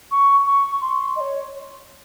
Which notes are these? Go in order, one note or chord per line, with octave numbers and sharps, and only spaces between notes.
C#6
C#6
C6
D#5
C#5